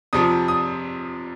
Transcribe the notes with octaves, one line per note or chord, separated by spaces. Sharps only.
F2 C3 F3 D#6
D#6